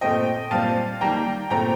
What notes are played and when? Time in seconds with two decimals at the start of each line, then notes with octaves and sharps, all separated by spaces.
0.01 A#2 A3 C4 D#5 G5
0.51 A#2 G3 C4 F5 A5
1.01 D#3 G3 A#3 G5 A#5
1.50 A#2 A3 C4 G5 A#5